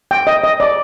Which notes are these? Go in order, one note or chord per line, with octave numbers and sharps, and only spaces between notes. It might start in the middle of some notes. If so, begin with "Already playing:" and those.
G5
D#5
D#5
D5